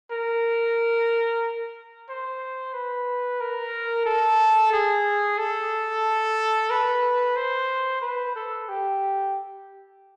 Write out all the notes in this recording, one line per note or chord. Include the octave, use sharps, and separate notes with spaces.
A#4
C5
B4
A#4
A4
G#4
A4
B4
C5
B4
A4
G4